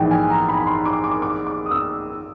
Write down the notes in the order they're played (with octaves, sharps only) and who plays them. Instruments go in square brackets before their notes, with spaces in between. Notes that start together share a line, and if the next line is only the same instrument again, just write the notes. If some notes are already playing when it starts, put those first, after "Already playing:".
Already playing: [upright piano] A#1 G#2 E3 [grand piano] G5
[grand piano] G#5
A#5
B5
B5
C6
D6
D6
D6
D6
D#6
E6